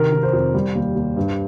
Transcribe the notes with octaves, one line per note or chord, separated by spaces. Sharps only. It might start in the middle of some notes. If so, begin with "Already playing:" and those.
Already playing: C3 D#3 A#4
D#3
C5
F2
G3
D#2
D#2
G2